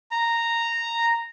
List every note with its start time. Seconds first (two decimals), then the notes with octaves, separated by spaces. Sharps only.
0.11 A#5